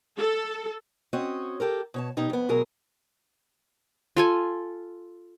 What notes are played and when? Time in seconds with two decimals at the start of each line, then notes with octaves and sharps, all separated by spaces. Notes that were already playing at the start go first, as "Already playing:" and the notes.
0.17 A4
1.13 C4 C#4 F#4 C#5 D#5
1.60 G4 A4 A#4
1.94 B2 C#5 A5
2.17 B2 D#4 G4
2.30 F2 B3
2.49 D2 B2 F#3 G#4 A#4
4.17 F4 A4 G#5